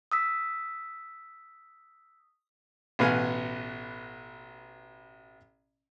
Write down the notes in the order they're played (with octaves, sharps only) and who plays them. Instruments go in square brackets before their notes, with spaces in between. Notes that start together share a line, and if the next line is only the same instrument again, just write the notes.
[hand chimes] D#6 E6 B6
[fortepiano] A1 B2 B4 F5 F#5 G#5